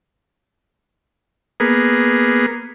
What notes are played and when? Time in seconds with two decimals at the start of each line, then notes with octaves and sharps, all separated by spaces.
1.60 A#3 B3 G#4